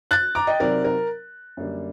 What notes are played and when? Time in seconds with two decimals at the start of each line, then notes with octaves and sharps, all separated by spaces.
0.11 F#6 A6
0.35 A#5 D6
0.47 D#5 G5
0.60 C3 F#3 C4 D#4 A#4 D5
0.84 A#4
1.57 F#2 D3 G3 A#3